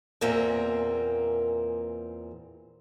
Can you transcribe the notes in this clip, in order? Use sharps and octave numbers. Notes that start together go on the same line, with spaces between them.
E2 A#2 A#3 C4 G#4 G5